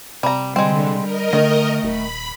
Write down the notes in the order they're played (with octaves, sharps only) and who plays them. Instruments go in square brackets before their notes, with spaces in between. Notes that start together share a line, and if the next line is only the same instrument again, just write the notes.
[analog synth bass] C3 [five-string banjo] G3 A#5
[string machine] D3 [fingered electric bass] G3 [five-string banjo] G#3 C4
[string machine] A#4 D#5
[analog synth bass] D3 [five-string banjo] D#3 [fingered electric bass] A3
[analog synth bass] D#1 [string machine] B5